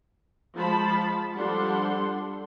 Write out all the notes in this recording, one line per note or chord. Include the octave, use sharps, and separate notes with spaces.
F3 G#3 A5 B5
F3 G3 D4 A4 F#5 C6